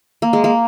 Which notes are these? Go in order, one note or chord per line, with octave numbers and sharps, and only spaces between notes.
A#3
G#3
A#3